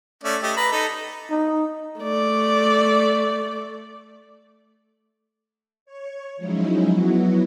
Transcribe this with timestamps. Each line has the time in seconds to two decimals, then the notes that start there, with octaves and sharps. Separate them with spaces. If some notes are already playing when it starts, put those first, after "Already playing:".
0.24 A3 C#4 D5
0.43 A3 G4 D#5
0.57 B4 A#5 B5
0.72 D#4 A4
1.31 D#4
2.00 A3 D5
5.85 C#5
6.37 F3 F#3 G#3 C#4 D#4 E4
6.91 F#3 B3 E4 F#4